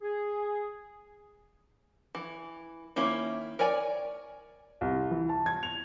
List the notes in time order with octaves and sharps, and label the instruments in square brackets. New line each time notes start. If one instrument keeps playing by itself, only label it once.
[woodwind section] G#4
[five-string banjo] E3
D#3 A#3 C#4 E4
A#4 C#5 D5 G#5
[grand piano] C2
E3
A5
G#6
F7